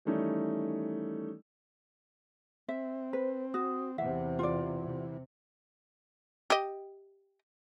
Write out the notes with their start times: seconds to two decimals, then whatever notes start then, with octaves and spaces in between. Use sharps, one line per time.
0.05 D#3 E3 G3 A3 C#4 D#4
2.69 C4 E5
3.13 B4 C5
3.54 F#4 D#6
3.98 E2 C3 E3 E5 F#5
4.39 F4 D5
4.87 C3
6.50 G4 D#5